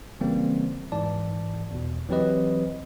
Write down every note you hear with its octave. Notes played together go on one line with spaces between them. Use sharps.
C#3 E3 G3 A#3 C4
G#2 E3 D5 A5
E2 B2
E3 F#3 C4 G4 B4 D#5